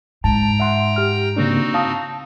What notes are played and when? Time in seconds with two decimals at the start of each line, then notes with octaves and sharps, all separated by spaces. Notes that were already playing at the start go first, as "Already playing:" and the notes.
0.24 G#2 G5 A5 A#5
0.60 E5 F#5 C6
0.96 G4 F6
1.36 C#3 A#3 C4 D4 D#4 F#4
1.74 F5 A5 D#6